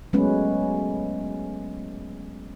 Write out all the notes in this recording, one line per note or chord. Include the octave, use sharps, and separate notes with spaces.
F#3 G#3 A3 B3 C#4 B4